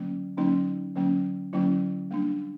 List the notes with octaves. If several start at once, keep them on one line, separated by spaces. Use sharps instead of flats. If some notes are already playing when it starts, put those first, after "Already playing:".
Already playing: D3 F#3 A#3 C#4
D3 F#3 A#3 C#4 D#4
D3 F#3 A#3 C#4
D3 F#3 A#3 C#4 E4
G3 A#3 D4